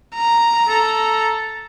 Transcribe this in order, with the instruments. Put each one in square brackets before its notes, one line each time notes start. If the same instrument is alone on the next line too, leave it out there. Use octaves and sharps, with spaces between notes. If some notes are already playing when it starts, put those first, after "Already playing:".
[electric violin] A#5
[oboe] A4